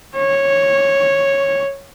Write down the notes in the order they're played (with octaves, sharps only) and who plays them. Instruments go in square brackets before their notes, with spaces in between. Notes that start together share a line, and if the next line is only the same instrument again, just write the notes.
[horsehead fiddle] C#5